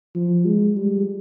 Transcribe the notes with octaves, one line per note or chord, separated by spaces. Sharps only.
F3
G#3
G3